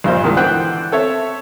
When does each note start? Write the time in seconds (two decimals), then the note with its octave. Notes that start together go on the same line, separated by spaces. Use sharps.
0.04 A#1 G2 A#2 C5 D#5
0.23 C2 A#2 D#3 G#3
0.37 D3 E3 B3 C5 G5 F#6
0.92 C4 A4 C#5 E5